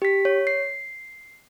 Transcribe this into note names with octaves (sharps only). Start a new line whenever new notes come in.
G4 B6
C#5
C7